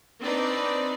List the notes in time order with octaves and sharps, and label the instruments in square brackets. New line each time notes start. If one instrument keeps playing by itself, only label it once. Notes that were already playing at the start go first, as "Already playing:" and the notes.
[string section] C4 D4 D#4 B4 D5